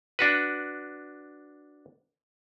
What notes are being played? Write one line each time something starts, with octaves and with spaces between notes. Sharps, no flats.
D4 F#4 B4